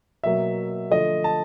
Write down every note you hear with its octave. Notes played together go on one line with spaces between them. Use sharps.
B2 F#3 A#3 E5
D3 F3 A3 D#5
A5